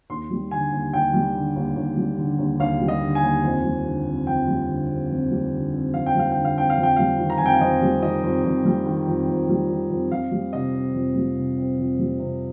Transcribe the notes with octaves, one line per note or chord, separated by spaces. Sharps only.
D#2 C6
G3
D3 G#5
D#2
D#2 G5
G3
D3
D#2
D#2
G3
D3
D#2
D#2 F5
G3
D#5
D3
G#5
D#2
F2
G3
D3
C4
F2 G5
G3
D3
C4
F2
G3
D3
C4
F2 F5
G5
G3 F5
D3 G5
F5
C4 G5
F5
F2
G5
G3 F5
D#3
A#5
F2 G#5
G5
F5
F2 D#5
G3
D#3 D#5
F2
F2
G3
D#3
F2
F2
G3
D#3
F2
F2 F5
G3
C3 D#5
C4
F2
G3
C3
C4
F2
G3
C3